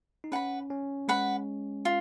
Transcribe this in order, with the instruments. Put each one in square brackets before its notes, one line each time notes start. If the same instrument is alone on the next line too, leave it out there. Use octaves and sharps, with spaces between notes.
[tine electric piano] D#4
[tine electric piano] C#4 [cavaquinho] B4 F#5 B5
[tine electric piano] C#4
[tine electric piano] G#3 [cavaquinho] B4 F#5 B5
[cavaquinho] F4